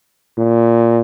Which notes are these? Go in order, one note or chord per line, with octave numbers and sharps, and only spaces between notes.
A#2